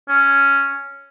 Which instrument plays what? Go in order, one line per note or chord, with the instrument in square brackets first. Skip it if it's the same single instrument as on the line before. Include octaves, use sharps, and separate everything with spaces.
[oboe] C#4